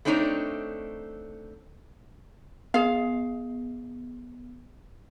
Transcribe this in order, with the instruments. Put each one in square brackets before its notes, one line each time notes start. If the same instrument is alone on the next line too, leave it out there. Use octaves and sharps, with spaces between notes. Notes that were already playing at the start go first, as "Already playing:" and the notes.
[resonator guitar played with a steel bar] A3 C4 D4 D#4 C5 C#5
[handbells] B3 [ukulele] G#4 F5